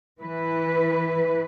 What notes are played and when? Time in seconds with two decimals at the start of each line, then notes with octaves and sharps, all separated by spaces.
0.21 E3 B4